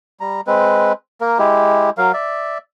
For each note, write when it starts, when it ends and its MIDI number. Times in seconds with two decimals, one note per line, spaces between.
0.20 0.41 55
0.20 0.41 82
0.47 0.93 56
0.47 0.93 60
0.47 0.93 71
1.21 1.38 58
1.21 1.38 70
1.39 1.90 56
1.39 1.90 64
1.39 1.90 67
1.98 2.12 54
1.98 2.12 70
1.98 2.12 77
2.14 2.58 74
2.14 2.58 76